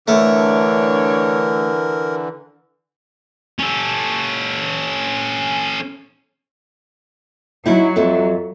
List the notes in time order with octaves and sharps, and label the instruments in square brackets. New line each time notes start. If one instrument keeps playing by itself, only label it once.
[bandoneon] D3 E3 [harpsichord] A3 [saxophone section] D4 C#5 [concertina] A#4
[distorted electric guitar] C#4 A4
[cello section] F#3 [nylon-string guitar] D#4 E4
[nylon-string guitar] F2 A4 E5